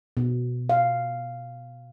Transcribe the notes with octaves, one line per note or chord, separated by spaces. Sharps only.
B2
F5